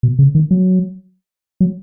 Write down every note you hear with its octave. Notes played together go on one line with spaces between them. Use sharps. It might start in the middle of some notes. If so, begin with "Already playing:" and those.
B2
C#3
D#3
F#3
F#3